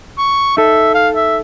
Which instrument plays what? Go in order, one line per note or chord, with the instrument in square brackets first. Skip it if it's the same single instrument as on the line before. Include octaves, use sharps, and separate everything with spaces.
[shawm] C#6
[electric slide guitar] D#4 A4 [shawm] E5
[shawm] F5
E5